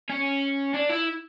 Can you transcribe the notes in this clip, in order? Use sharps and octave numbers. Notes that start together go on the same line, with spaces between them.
C#4
D4
E4